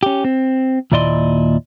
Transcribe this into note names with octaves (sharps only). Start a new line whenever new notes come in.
C#4 G4
C4
D#2 A#2 E4 D5 D#5 C6